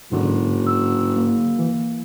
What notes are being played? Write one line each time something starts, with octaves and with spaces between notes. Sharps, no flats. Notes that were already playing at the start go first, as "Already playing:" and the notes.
F#1 G#2 D3
E6
A#3
E3